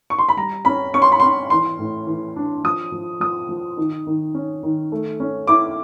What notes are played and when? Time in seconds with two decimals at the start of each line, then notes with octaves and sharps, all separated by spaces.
0.10 C#6
0.19 C6
0.29 B5
0.37 G3 A#5
0.65 C#4 B5
0.94 C#4 C#6
1.02 C6
1.12 B5
1.20 C#4 C6
1.50 E3 C6
1.79 A2
2.07 E3
2.36 D4
2.64 F3 D#6
2.92 F3
3.20 F3 D#6
3.49 F3
3.77 D#3
4.07 D#3
4.34 C#4
4.63 D#3
4.92 A3
5.20 C#4
5.47 E4 D6